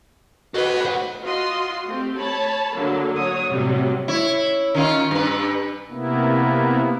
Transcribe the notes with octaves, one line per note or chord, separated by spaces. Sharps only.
F#4 A4 B4 D#5
C5 F#5
F4 F#4 D#5 C6
A3 C4 G4
C#5 A5 B5
D3 F#3 A#3
F#3 C#5 D#6
A2 C3 F#3 G3
E4 C#5
D#3 C#4 F4
G2 B4
C3 A#3 B3 E4